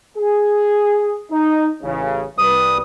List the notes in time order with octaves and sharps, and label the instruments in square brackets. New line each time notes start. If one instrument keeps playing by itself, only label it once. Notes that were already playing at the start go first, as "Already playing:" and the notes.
[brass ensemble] G#4
D#4
A1 C#3
[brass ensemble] C2 G3 B4 [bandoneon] D#6